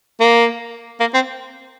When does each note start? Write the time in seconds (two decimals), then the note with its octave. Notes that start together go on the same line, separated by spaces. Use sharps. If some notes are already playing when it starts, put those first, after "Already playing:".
0.21 A#3
1.00 A#3
1.14 C4